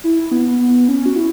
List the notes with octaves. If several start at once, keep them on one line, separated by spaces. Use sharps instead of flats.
E4
B3
B3
C#4
F#4
E4